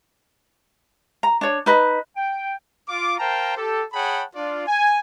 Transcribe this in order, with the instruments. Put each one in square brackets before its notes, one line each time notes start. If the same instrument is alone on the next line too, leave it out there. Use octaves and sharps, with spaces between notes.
[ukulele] A#5
D4 C#5
D#4 B4 D#5
[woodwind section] G5
[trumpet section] F4 D6
A#4 C5 F5 G5 A5 A#5
G4 A4
G#4 C#5 F#5 G5 A5 B5
D4 F4 D5
G#5